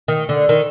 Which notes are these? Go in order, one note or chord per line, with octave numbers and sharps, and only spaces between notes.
D#3
D3
D#3